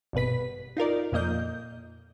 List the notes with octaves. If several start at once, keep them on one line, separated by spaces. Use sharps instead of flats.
G#1 G2 B2 B4 B6
D#4 F4 A#4 D5
F2 A#2 A#3 D#5 G6